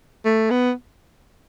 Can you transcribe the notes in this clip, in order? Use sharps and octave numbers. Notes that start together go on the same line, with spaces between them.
A3
B3